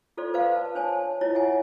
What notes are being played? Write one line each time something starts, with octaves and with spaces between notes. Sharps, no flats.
F4 A4 C5 D5 C6
A4 B4 C5 F5
A5
D4 C5 C#5 G#5 A5
E4 F4 C#5 D#5
E5 F#5 G#5